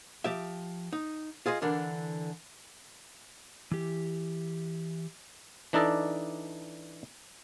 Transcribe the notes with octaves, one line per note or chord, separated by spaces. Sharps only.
F3 G4 E5
D#4
F4 G#4 C5 D#5
D3 E3 D4 A#4
E3 G4
E3 D4 D#4 A4 D5 D#5